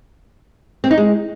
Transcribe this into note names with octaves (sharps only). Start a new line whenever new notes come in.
C4
D#4
G#3